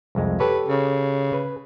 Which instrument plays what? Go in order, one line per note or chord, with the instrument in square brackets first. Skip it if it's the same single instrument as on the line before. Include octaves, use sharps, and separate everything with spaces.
[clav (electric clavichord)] C2 F2 G#3
[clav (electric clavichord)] G4 A4 C#5 [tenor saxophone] B4
[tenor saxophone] C#3
[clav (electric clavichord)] B4